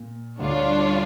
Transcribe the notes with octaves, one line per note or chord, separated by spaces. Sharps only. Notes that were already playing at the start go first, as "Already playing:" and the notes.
Already playing: A#2
D2 D3 G3 D4 F4 C#5